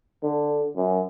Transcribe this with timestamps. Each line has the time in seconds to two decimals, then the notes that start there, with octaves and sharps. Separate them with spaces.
0.23 D3
0.76 F#2